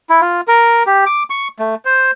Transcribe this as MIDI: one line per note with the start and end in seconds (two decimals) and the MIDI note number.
0.10 0.21 64
0.21 0.41 65
0.48 0.83 70
0.87 1.04 67
1.06 1.23 86
1.30 1.48 85
1.59 1.75 57
1.85 2.11 72